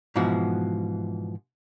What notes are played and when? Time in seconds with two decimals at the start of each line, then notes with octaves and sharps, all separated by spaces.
0.16 G#2 B2 E3 F3 F#4